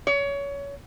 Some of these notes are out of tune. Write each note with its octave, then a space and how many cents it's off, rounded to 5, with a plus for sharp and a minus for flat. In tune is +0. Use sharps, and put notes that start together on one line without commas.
C#5 +25